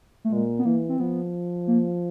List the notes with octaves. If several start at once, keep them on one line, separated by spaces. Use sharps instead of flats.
A3
A#2 G#3
B3
E3 A#3
C4
F3 B3
A#3